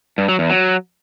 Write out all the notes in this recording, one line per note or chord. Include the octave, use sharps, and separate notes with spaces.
G2
F#3
E2
F#3